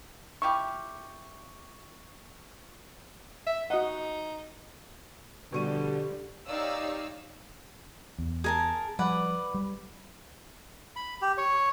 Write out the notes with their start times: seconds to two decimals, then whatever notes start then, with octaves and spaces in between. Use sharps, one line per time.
0.42 E4 F4 G4 C#6
3.47 E5
3.70 D#4 F#4 D#5 F#5
5.52 B2 D3 F3 G3 C#6 D#7
6.47 D#4 G4 C#5 D5 F5 E6
8.19 E2
8.44 G#4 A#4 A5
8.99 F3 G3 B4 D5 F#5
9.54 G3
10.96 B5
11.22 G4
11.38 C#5